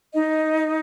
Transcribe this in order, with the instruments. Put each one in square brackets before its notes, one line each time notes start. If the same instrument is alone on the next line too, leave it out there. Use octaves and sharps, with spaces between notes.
[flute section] D#4 D#5